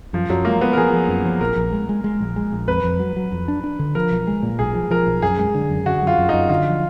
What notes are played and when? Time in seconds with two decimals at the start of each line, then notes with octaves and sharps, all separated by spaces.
0.13 F#2 F3
0.30 F#2 F#3
0.45 G#3 A#3
0.61 G#3 B3
0.73 A#4
0.77 F3 G#4
0.93 F3
1.08 F#2
1.25 F3
1.41 A#1 A#4
1.56 A#1
1.72 G#3
1.89 G#3
2.04 G#3
2.20 A#1
2.36 G#3
2.52 A#1
2.68 F2 B4
2.84 F2
3.00 F#3
3.16 F#3
3.32 F2
3.48 D4
3.64 D4
3.79 D3
3.95 F3 A#4
4.11 B1
4.27 G#3
4.42 A#2
4.59 B1 G#4
4.74 F3
4.91 F3 A#4
5.07 B1
5.22 F#2 G#4
5.39 G#3
5.55 D3
5.70 F#2
5.86 D3 F#4
6.02 F#2
6.07 F4
6.18 F#2
6.29 F#2 D#4
6.49 D3 F4
6.66 F3